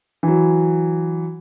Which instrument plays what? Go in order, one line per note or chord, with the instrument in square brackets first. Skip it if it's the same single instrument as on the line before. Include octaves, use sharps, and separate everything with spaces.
[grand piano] E3 F#3